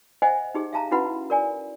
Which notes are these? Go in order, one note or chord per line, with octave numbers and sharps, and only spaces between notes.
C5 D#5 E5 F#5 G#5
D#4 G4 G#4
E5 F5 A5 A#5
C#4 E4 F#4 B4 F#5 B5
A#4 D5 G#5